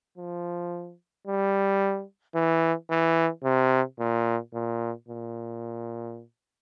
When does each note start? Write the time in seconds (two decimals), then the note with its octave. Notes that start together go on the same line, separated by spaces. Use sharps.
0.18 F3
1.27 G3
2.35 E3
2.91 E3
3.44 C3
3.99 A#2
4.54 A#2
5.08 A#2